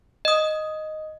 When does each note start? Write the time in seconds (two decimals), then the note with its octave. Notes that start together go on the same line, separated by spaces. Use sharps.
0.25 D#5 D#6